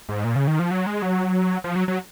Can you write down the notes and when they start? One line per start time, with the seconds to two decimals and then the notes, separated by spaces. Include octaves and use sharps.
0.09 G#2
0.24 A#2
0.36 C#3
0.47 D#3
0.59 F3
0.71 F#3
0.86 G#3
1.02 F#3
1.64 F3
1.76 F#3
1.88 F#3